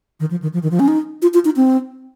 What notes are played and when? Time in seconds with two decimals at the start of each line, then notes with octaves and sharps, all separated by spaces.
0.20 D#3
0.31 F3
0.42 D#3
0.53 F3
0.63 D#3
0.71 F3
0.79 C#4
0.88 D#4
1.22 F4
1.34 F4
1.45 D#4
1.56 C4